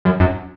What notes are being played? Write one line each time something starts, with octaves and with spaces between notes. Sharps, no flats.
F#2
F#2